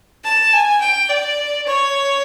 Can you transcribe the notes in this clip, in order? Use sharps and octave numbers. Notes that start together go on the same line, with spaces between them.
A5
G#5
G5
D5
C#5